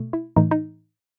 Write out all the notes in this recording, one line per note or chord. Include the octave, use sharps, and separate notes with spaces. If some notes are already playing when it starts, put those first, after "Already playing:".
Already playing: B2 A3
E4
A2 E3 A3 D#4
D#4